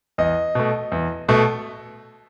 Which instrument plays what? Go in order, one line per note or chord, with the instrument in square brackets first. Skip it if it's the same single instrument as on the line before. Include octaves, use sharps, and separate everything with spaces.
[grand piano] E2 D#5
B2 A3
E2
B2 A3